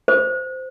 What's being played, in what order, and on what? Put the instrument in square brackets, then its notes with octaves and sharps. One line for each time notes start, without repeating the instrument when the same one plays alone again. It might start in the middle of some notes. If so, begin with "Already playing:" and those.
[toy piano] C5